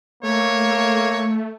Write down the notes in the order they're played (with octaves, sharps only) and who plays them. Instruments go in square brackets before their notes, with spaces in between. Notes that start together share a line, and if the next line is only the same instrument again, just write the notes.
[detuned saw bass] A3 [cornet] A#3 [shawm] C#5